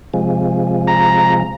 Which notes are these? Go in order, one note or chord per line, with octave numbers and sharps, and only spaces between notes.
C3 F3 G#3
A#5